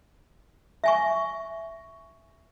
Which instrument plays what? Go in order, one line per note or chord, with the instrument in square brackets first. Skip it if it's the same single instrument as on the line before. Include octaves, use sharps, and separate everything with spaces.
[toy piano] E5 G#5 C#6